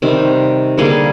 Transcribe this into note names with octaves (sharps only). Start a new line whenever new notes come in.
C3 D#3 G3 C4
D3 G3 A#3 G#4